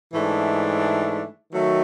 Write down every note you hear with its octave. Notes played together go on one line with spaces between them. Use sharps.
G#2 E3 A3 D4
D#3 F#3 A3